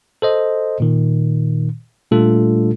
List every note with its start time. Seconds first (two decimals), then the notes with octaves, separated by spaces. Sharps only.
0.22 A4 C5 D#5
0.80 A#2 D#3
2.12 A#2 G3 A3 D4 F4 A4